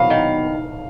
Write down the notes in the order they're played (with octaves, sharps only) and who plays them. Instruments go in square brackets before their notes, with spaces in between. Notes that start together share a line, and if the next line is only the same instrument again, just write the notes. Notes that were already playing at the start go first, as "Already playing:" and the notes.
Already playing: [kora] F#3 B3 [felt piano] F5
[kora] D#3